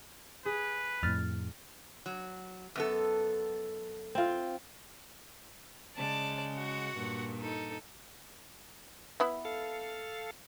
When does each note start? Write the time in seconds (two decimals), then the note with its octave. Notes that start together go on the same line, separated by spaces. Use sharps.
0.45 G#4 B4
1.03 F2 A2 F6 A6
2.06 F#3
2.76 F#2 B3 A4
4.15 C4 F4
5.96 C#3 G#3 C#4 D5 A5
6.55 F#4 F#5
6.96 G2 A#2
7.41 D#4 A4
9.20 B3 E4 B5
9.45 A4 F5